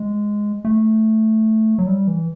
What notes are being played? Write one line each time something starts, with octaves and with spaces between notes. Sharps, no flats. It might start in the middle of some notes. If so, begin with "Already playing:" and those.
Already playing: G#3
A3
F#3
G3
E3